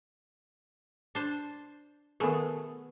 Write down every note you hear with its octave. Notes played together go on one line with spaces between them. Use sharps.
D4 C5
D#3 A3 B3 G#4 A#4